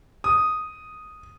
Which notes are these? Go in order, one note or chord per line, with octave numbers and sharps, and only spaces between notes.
D#6